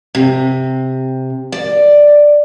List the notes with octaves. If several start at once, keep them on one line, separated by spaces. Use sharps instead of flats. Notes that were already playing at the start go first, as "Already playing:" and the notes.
C3
D5